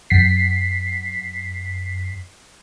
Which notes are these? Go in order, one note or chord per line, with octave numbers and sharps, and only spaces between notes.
F#2 B6 C7